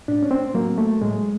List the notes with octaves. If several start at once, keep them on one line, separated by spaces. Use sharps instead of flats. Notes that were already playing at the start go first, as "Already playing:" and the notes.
A2 D4
C#4
C4
F#3 A#3
A3
A2 G#3